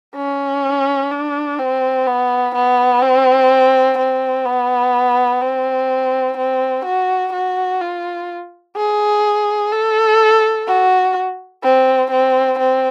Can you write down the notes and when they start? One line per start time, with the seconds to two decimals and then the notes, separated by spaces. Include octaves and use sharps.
0.15 C#4
1.11 D4
1.59 C4
2.06 B3
2.55 B3
3.02 C4
3.98 C4
4.46 B3
5.41 C4
6.37 C4
6.85 F#4
7.33 F#4
7.81 F4
8.76 G#4
9.72 A4
10.68 F#4
11.63 C4
12.11 C4
12.59 C4